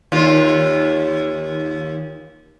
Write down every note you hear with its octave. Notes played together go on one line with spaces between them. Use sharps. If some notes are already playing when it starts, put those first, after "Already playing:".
D#2 F4